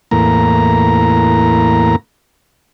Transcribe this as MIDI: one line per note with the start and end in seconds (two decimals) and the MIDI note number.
0.11 1.96 40
0.11 1.96 45
0.11 1.96 58
0.11 1.96 82